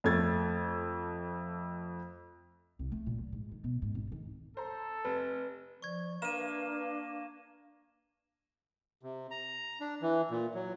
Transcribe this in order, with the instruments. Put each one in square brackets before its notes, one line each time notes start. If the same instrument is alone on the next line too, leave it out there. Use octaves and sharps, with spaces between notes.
[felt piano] F2 A3 G#6 A6
[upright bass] C2
A3
A#2
F#3
G#2
D#3
B2
G#2
G#1
D#3
[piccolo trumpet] A4 [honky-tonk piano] C5 A#5
[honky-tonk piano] F1 [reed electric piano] B4
[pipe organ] F3 [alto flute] D5 [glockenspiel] C#6 G#6
[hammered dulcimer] A#3 [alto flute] D4 [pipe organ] B4 F5 [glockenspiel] D#7 E7
[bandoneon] C3
A#5
D4
E3
A#2
F#3